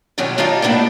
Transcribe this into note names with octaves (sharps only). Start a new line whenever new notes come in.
B2 D#3 F#3 C#4 F4 G4
D4 D#4 F4 D#5 F5 A#5
A2 A#3 B3 D4 E4